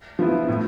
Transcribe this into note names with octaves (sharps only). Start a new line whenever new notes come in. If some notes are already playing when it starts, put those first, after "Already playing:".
F3 B3 E4
A2